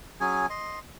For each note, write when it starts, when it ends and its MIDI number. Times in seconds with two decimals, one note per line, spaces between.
0.21 0.46 54
0.21 0.46 61
0.21 0.46 68
0.21 0.46 80
0.50 0.79 75
0.50 0.79 84